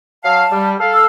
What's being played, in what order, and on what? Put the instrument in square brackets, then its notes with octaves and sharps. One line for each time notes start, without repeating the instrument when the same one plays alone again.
[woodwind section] F#3 F5 [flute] A5
[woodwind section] G3
A4 F5
[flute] E6